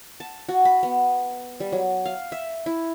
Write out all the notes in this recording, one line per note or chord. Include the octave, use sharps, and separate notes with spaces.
A5
F#4
B5
B3
G3
F#3
F5
E5
E4